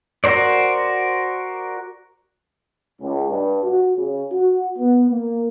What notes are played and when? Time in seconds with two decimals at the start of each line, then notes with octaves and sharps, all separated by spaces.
0.24 F#4 A#4 C5 D5
3.01 C#2
3.30 G2
3.63 F#4
3.97 C#3
4.32 F#4
4.79 B3
5.09 A#3